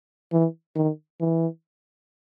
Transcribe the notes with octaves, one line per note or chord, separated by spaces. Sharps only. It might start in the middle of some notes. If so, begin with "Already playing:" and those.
E3
D#3
E3